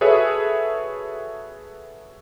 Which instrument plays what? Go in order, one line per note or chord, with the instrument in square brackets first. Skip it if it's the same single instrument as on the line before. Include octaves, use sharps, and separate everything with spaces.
[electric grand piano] F#4 G#4 A4 B4 C#5 E5